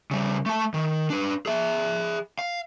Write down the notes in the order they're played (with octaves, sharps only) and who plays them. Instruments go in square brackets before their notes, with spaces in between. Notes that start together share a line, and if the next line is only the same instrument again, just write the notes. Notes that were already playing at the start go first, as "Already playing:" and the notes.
[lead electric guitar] C#3 G3
A3 A5
D#3
D4 B4
G#4 E5
F5